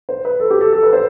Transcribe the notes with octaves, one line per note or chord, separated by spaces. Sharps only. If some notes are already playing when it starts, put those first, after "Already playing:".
C5
B4
A4
G4
A4
A4
B4
C5